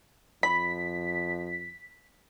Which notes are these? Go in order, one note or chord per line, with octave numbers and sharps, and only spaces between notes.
F2 B5 B6